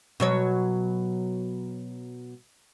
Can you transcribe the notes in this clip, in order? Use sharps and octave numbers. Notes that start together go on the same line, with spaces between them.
B2 F#3 C#5